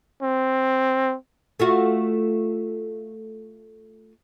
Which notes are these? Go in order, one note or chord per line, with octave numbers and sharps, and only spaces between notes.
C4
A3 F4 F#4